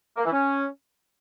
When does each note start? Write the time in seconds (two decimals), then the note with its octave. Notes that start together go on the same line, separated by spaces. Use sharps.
0.17 A#3
0.25 E3
0.32 C#4